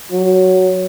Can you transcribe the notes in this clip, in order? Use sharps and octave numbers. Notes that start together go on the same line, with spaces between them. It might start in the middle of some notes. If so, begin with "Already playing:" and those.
F#3